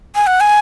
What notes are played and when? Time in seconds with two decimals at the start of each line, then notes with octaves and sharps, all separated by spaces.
0.15 G#5
0.27 F#5
0.40 G#5